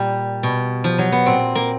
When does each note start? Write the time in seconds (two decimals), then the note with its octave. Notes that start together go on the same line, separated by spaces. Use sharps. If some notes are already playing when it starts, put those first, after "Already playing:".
Already playing: A#2 G3
0.43 B2
0.84 F3
0.98 F#3
1.12 B3
1.26 A#2 C4
1.55 A#3